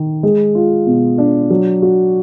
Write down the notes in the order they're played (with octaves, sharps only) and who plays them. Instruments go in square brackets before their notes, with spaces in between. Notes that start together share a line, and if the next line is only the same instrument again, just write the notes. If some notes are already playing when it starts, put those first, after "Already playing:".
Already playing: [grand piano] D#3
G#3
F4
B2
D4
F#3
F#4